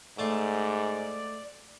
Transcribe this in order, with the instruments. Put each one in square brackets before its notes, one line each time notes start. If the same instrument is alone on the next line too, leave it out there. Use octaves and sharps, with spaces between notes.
[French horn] G#2 [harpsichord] A3 A5 C6 [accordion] D5